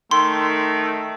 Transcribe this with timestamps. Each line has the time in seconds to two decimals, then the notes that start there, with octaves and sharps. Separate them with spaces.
0.11 D#3 A3 C6